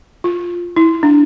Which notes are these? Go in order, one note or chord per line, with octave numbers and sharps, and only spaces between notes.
F4
E4
D4